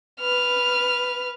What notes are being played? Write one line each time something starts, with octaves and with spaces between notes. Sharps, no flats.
B4 F6